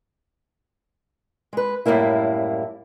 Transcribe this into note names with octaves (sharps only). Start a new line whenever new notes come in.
G#3 B4
F#2 A2 G3 A#3 E4